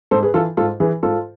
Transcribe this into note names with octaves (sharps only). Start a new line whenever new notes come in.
G#2 A4 C5
G#4 B4
E3 F4 A4
G#2 F4 A4
E3 G#4 B4
G#2 F4 A4